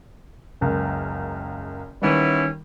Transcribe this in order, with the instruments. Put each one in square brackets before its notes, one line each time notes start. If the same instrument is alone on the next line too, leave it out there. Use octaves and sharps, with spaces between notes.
[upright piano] F#1 C#2 A#4
[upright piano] D#3 G3 [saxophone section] E3 B3 C#4